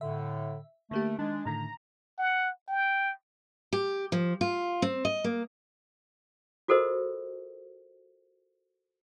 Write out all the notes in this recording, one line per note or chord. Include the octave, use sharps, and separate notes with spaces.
A2 D3 E5
D3 A3 A#3 G4
D#3 G#3 D4
A2 D3 D#3 A#5
F#5
G5
G4
F3
F4
C4
D#5
A#3
F4 F#4 A4 A#4 C5 D#5